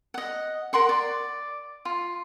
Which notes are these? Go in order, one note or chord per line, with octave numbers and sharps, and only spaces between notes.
D#5 F#5
A#4 F#5 C6 C#6
D5
F4